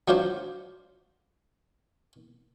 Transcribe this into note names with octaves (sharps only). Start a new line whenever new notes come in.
F#3 D4 F4 C5 C#5